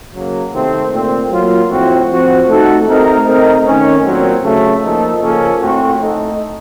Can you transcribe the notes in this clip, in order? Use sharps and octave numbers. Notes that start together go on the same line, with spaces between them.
C#3 F#3 A#3
C3 D#3 A3 C4
A#2 A3 C4
F#3 A#3 F4
A2 F3 C4 F#4
F3 C4 F#4
A3 D#4 F#4 A4
A3 C4 D#4 A#4
A3 C4 D#4 A#4
D#3 A3 C#4
A#2 F#3 C4
C#3 F#3 A3
F3 A#3 D#4 A4
C#3 F3 A#3 C#4 A4
A2 A3 C4 F#4
A3 D#4 A4